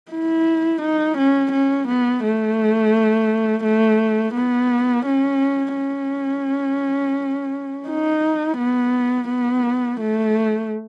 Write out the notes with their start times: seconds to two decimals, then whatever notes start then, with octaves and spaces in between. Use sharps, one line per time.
0.12 E4
0.82 D#4
1.18 C#4
1.52 C#4
1.88 B3
2.24 A3
3.64 A3
4.35 B3
5.06 C#4
5.76 C#4
7.89 D#4
8.58 B3
9.29 B3
10.00 A3